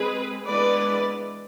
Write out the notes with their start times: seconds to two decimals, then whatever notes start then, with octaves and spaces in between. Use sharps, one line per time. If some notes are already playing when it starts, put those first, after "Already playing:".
Already playing: G#3 C4 G#4 B4
0.47 E3 G#3 B3 D4 B4 D5